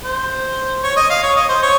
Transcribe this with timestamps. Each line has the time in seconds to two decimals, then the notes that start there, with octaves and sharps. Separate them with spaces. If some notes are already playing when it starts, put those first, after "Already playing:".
0.05 C5
0.83 C#5
0.96 D#5
1.10 F5
1.23 C#5
1.36 D#5
1.49 C5
1.63 C#5